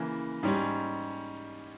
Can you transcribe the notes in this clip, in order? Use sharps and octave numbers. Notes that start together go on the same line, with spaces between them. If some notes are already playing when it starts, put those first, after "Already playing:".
Already playing: C#3 E3 A#3
G#2 G3 C#4